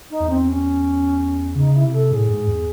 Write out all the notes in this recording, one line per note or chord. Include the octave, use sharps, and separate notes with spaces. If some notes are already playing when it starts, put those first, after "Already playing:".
D#4
E2
C4
C#4
C#3 D#4
E4
C3
A4
A2 G#4
G#2
E2